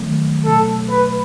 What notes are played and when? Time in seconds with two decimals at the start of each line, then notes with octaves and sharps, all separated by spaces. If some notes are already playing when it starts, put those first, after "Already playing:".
Already playing: D#3 F#3 A3
0.45 B2 F#3 A3 A4
0.90 B4